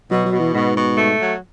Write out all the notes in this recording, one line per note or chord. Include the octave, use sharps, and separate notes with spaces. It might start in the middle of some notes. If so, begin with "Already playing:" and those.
B2 F#3
F#3
B2
E3
G#2 B2
B2
A3
F#3